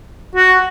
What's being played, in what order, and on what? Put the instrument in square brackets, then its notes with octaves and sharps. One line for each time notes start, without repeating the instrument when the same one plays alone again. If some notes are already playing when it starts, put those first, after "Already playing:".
[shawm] F#4